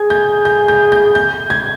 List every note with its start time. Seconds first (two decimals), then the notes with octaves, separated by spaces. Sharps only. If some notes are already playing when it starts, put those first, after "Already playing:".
Already playing: G#4 G#6
0.10 G6
0.45 G6
0.68 G6
0.92 G6
1.15 G6
1.50 G#6